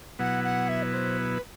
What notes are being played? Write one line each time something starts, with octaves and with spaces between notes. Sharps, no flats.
B2 F#3 B3 E4 F#5
F#5
E5
B4
C5
B4